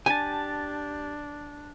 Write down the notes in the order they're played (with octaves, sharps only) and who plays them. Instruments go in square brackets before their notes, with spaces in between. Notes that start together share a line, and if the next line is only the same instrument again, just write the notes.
[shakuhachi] D4 [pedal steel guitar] G4 A5 [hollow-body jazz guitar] G#5